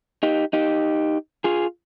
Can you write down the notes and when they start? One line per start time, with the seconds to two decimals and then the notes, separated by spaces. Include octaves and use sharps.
0.23 D#4 G4
0.53 D#4 G4
1.44 F4 G#4